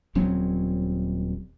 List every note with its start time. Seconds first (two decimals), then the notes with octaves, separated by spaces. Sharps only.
0.15 D#1 F#3 C4 C#4